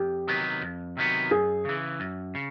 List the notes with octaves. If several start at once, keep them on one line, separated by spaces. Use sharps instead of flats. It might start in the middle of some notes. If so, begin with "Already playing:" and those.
Already playing: F2 G4
C3 D#3 F#3 B3
F2
C3 D#3 F#3 B3
F#2 G#4
C#3 E3
F#2
C#3